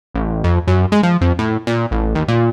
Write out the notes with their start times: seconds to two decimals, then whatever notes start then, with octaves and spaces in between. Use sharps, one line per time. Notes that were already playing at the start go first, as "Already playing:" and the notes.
0.14 A1
0.44 F2
0.67 F#2
0.92 G#3
1.03 F3
1.21 F2
1.39 A2
1.67 A#2
1.91 A1
2.15 D#2
2.28 A#2